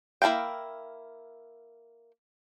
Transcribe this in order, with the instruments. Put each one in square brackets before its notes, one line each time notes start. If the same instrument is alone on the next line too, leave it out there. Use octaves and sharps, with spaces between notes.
[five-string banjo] A#3 E4 A#4 F5 G5